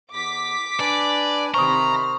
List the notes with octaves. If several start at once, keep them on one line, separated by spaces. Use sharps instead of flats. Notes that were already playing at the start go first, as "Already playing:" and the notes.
E2 D6 B6
D4 B4 D5 G#5
C3 D#3 C5 A#5 B5 C#6 D#6 F6